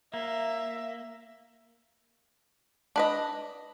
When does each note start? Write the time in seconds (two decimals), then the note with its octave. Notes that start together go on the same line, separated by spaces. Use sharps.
0.14 A#3 E5
2.96 D4 B4 D#5